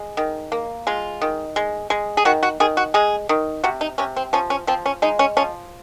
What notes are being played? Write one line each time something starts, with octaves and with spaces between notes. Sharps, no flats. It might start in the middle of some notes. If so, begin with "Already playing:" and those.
Already playing: G#3
D#3
A#3
G#3 F4
D#3
G#3
G#3
G#4
D#3 F#4
F#4
D#3 G#4
F#4
G#3 G#4
D#3
C3 F#4
D#4
C3 C#4
C4
F3 C#4
C#4
F3 C4
C#4
G#3 D#4
C#4
F3 C#4